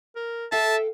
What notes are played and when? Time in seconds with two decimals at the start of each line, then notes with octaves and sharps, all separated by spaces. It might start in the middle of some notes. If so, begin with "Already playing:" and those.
0.16 A#4
0.52 A4 E5 F5 G5 A5